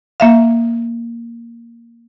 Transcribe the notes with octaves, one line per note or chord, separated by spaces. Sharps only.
A#3 E5 F5